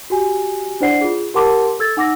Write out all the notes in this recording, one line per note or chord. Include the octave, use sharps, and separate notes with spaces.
F#4 G4 G#5
D4 E4 C5 D5 F#5 C7
F4 G#4
G4 A#4 F#5 A5 C6 D6
A4 E6 G#6 A6
D#4 F#5 D6 E6 A#6